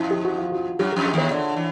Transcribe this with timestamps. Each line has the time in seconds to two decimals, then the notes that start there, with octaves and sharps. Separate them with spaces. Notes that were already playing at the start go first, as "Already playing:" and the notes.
Already playing: F2 F3 E4 F4
0.11 G4
0.25 F#4
0.38 F4
0.52 F#4
0.79 F#2 F#3 G4
0.92 F2 F3 G4
1.05 G#4
1.13 D#2 D#3 C#5
1.31 D3 D5
1.56 E3